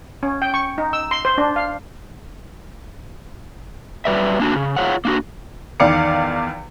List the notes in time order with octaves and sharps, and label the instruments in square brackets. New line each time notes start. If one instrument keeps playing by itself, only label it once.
[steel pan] C#4
G5
C#6
D#4
E6
C6
C5
D4
F5
[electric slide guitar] F#3 G3 B4 D5 E5
A#3 D4 F#4
C#3
F4 G#4 C#5 F5 F#5
A#3 D4 F#4
[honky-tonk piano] E2 D#3 D5 F5 D6 C#7